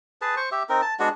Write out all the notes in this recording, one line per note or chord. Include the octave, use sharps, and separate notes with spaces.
G#4 B4 A5
C5 C#6
G4 E5
C4 D#4 A#4
A5
G#3 B3 D4 F#4